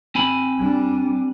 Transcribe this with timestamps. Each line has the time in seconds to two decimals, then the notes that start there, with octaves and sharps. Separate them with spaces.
0.15 C4 G#5 B5
0.58 G3 D4